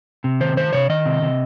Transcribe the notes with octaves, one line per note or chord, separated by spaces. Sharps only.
C3
D#3 C5
D#3 C5
C3 C#5
D#3 D#5
C3
C3